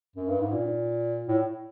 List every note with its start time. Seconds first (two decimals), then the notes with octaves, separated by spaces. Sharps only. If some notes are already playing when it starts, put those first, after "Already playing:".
0.15 F#2
0.28 G2
0.40 G#2
0.53 A#2
1.28 A2